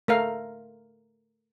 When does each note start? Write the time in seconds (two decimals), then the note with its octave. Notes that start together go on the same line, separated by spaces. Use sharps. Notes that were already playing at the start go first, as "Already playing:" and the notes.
0.08 A3 A#4 F5